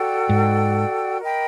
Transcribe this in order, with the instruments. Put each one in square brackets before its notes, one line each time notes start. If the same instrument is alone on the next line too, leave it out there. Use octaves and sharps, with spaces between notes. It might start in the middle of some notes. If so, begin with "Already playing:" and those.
Already playing: [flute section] F#4 A4 D5 G5
[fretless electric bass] G#2
[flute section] A#4 D#5 G5 B5